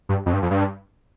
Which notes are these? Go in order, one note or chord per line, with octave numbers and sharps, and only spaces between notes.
G2
F2
G2
F2
G2